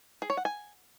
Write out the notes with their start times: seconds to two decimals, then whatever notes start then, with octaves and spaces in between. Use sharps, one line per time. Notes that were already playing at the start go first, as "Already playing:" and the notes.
0.22 G#4
0.30 C#5
0.37 F#5
0.45 G#5